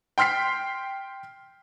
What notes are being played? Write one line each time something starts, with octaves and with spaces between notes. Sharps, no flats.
G5 C6 F6 B6 C7